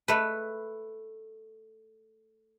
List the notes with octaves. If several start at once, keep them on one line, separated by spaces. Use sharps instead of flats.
A3 B4